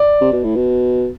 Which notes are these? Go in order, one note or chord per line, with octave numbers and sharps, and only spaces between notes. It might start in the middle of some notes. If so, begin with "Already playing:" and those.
Already playing: D5
C3
B2
A2
B2